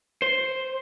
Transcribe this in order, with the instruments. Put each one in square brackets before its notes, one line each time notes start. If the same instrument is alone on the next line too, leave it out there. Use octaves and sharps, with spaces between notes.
[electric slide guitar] C5